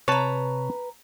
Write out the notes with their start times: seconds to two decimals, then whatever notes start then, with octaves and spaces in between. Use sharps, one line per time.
0.08 C3 B4 C#5 A5 A#5